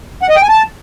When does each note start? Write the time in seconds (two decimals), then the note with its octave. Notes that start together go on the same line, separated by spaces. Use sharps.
0.23 F#5
0.29 D#5
0.36 G5
0.42 G#5
0.49 A5